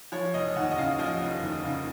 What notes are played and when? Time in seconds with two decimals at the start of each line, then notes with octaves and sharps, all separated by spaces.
0.12 F3 C#5
0.34 F1 D#5
0.56 D#2 F#5
0.71 D#5
0.78 C#3 F5
0.99 F3 D#5
1.21 F1
1.42 D#2
1.64 C#3